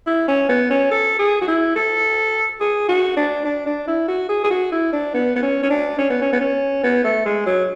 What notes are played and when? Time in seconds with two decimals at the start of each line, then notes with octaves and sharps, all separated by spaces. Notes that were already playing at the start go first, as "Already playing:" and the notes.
0.07 E4
0.28 C#4
0.49 B3
0.70 C#4
0.91 A4
1.19 G#4
1.42 F#4
1.48 E4
1.76 A4
2.61 G#4
2.89 F#4
3.17 D4
3.45 D4
3.66 D4
3.87 E4
4.08 F#4
4.29 G#4
4.44 G#4
4.51 F#4
4.72 E4
4.93 D4
5.14 B3
5.36 B3
5.42 C#4
5.63 C#4
5.70 D4
5.98 C#4
6.10 B3
6.22 C#4
6.33 B3
6.41 C#4
6.84 B3
7.04 A3
7.26 G#3
7.46 F#3